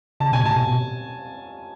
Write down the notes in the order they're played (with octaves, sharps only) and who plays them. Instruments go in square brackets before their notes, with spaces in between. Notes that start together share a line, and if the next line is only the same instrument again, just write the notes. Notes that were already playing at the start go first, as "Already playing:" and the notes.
[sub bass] C#3 [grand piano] A5
[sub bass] B2 [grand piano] G#5
[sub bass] A2 [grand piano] A5
[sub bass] B2
B2